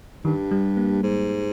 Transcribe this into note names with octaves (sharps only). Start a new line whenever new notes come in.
G2 D#3
G3
A#3
G#2